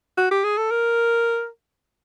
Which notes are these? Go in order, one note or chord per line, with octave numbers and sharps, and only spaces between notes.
F#4
G4
G#4
A4
A#4